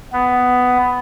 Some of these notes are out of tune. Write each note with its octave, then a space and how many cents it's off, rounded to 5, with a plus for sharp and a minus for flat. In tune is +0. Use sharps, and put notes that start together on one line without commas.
B3 +10